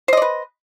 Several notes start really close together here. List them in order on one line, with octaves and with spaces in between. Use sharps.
C5 D#5 D5 B4